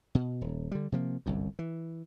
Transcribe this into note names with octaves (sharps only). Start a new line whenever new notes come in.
B2
D#1
D3 G3
C3 F3 A#3
G1 C2 F#2
E3